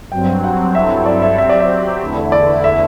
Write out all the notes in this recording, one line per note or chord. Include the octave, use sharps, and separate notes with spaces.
G2 F#3 C4 G5
F#5
G2 F#3 C4 E4 A4 E5
D5
E5
F#3 C4 G4 E5
D5
E5
E2 D3 A3 E4
D5
E5